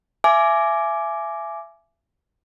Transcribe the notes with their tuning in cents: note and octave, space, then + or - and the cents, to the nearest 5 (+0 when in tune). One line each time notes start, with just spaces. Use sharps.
E5 +30 G#5 +20 D6 +0